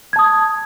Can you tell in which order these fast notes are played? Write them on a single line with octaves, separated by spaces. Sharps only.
G#6 A5 D#6